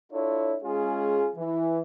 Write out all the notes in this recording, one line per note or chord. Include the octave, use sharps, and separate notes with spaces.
D4 E4 F4 A4 C#5
G#3 C#4 F4 G#4
E3